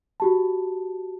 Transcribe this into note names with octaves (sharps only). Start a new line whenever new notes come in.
F#4 G4 A5